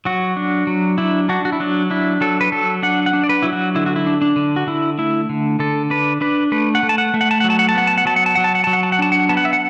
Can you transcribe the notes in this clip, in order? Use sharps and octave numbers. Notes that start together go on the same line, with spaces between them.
F#3 F#4
D4
F#3
D4 E4
D4 F#4
F#4
E4
F#3 D4
D4 E4
F#3 A4
B4
F#3 A4
D4 F#5
F#5
D4
D5
B4
F#3 E4
F#4
D3 E4
F#4
E4
D4
D4
D3
F#4
D3 E4
A3 E4
D3
D3 A4
D4 B4
D4 B4
A3 B4
F#5
A3
A5
F#5
A3
F#5
A5
F#3 F#5
A5
F#5
A5
B3 F#5
A5
F#5
F#3 A5
F#5
A5
F#3 F#5
A5
F#5
F#3 A5
F#5
A5
F#5
D4 A5
F#5
B3 A5
F#5
E5
F#5